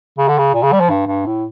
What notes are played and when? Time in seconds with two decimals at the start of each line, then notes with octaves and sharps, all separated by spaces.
0.18 C#3
0.28 D3
0.38 C#3
0.54 A#2
0.62 C#3
0.72 G3
0.80 F3
0.90 G2
1.07 G2
1.26 A2